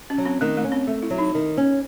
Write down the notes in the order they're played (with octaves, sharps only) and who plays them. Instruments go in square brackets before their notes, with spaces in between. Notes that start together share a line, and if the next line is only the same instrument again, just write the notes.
[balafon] C#4
[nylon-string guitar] F#3
[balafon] C4
[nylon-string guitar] D#3 [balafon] A3
[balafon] A3
[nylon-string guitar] C#4
[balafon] C4
[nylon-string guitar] A3
[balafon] E4
[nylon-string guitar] F#3
[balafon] D#4
[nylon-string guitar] D#3
C#4